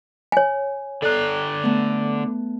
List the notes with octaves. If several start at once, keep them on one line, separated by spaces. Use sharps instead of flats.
C#5 G#5
D3 A4 D5 A#5 F#6
A3 B3